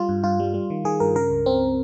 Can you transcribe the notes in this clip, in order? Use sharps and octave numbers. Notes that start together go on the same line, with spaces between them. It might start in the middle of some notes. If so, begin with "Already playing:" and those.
Already playing: G3 F4
G2
G2 F4
G3
G3
D#3
D#3 G#4
G2 A#4
C#3 A#4
C#2
C#2 C4